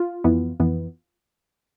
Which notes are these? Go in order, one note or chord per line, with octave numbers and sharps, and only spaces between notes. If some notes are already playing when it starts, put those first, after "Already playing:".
Already playing: F4
F2 E3 B3
F2 E3 B3